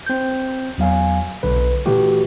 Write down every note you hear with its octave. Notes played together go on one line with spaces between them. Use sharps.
C4 G6
E2 F#3 F5 G#5
B1 D3 B4
A#2 D3 E3 A3 F#4 G4